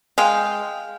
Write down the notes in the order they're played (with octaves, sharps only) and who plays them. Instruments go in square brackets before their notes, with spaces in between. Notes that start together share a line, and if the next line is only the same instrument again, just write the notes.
[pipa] G#3 [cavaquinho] F5 G5